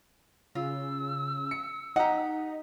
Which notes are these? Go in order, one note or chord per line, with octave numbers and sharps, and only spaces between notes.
C#3 F4 E6
C#7
D#4 G4 D#5 F#5 A#5